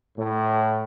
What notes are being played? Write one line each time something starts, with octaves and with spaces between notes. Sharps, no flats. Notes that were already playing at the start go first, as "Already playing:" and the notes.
A2